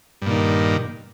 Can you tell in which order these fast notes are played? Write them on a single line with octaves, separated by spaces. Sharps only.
G2 A#2 D#3